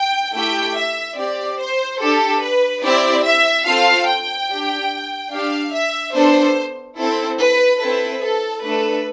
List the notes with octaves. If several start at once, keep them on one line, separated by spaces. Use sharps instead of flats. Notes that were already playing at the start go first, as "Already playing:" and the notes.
Already playing: G5
A3 E4 G4 G5
E5
C4 G4 D5
C5
D4 G4 A4
B4
C4 E4 G4 D5
E5
C4 F4 A4 F5
G5
D4 G4
D4 G4 F5
E5
B3 D4 A4 C5
C4 E4 A4
B4
C4 E4 A4 B4
A4
A3 D4 A4 B4